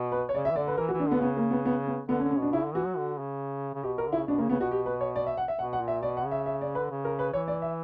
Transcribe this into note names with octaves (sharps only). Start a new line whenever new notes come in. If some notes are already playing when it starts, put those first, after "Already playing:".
Already playing: B2
B4
C#5
C#3 D5
E5
E3
D3 D5
B4
E3 A#4
F#4
E3
D4
D3 B3
C#3 B3
A#3
B3
B3
B3
D3 B3
C#4
D3
C#4
B2 D4
C#3 E4
D3
E3 F#4
F#3
D3
C#3
C#3
B2 G4
A#4
D3
E4
C#3
B2 D4
C#3 A#3
C#3 B3
B2 F#4
G4
B4
C#5
D5
E5
F#5
E5
B2 F#5
F#5
A#2
E5
B2 D5
F#5
C#3
E5
E5
D5
B4
D3
C#3
A#4
B4
E3 C#5
D5
E5